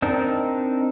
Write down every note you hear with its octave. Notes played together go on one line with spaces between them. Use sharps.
C4 D4 D#4 A#4